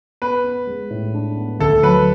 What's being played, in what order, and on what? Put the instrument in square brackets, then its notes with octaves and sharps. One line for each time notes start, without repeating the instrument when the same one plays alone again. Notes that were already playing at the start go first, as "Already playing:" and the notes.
[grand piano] B3 [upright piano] B4
[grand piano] B3
G#3
A2
D4
B3
[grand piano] D2 [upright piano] A4
[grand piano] F#3 [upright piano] B4